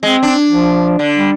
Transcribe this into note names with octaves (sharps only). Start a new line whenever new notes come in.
G#3 C4
D4
F3
D3 D4
G3